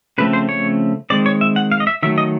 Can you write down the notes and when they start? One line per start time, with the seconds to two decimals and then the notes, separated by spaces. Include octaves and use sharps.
0.18 C#3 F3 A3 C4 B4
0.33 C5
0.49 C#5
1.10 D#3 G#3 C4 D5
1.26 C#5
1.41 E5
1.56 F#5
1.72 F5
1.80 D#5
1.87 E5
2.03 D#3 F#3 A3 E5
2.18 D#5